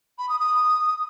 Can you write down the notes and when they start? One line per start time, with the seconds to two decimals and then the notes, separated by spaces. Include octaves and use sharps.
0.18 B5
0.29 D#6
0.39 D#6